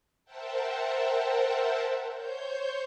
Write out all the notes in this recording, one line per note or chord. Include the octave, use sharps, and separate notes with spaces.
A#4 C5 E5 F#5 G5 A5
C5 C#5 G6